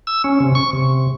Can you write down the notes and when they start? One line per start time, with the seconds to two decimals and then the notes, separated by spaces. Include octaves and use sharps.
0.07 E6
0.24 C#4
0.40 C3
0.55 C#6
0.73 C3